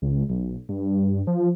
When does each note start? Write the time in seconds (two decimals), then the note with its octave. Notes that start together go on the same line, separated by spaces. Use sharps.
0.02 C#2
0.30 B1
0.69 G2
1.27 F3